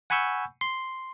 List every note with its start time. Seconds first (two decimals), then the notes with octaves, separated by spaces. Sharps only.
0.10 F#5 G#5 B5 C#6 E6 G6
0.61 C6